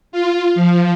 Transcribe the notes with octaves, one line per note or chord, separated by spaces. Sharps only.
F4
F3